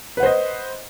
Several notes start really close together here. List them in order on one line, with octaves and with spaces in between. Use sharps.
B4 F#5 C5 D#5